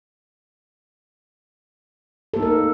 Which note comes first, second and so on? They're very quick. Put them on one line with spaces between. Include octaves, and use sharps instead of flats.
A4 A#3 D#4 A#4